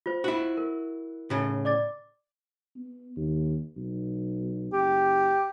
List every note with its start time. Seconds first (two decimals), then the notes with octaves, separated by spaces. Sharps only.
0.06 F4 C5
0.24 E4 F#4
0.57 A#4
1.30 A2 C#3
1.65 D5 D6 A6
2.76 B3
3.16 D#2
3.76 B1
4.73 F#1 G4